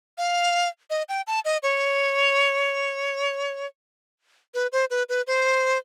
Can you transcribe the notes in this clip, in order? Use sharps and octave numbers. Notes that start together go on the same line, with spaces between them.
F5
D#5
G5
A5
D#5
C#5
B4
C5
B4
B4
C5